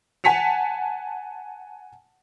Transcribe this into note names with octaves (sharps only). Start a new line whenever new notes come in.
F#5 G#5 A5 B6 C#7 F7